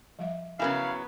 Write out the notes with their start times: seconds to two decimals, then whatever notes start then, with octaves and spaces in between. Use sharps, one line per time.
0.19 F3 G3 E5
0.59 C#3 F#3 B3 C#4 E4 A#4 F5 G#5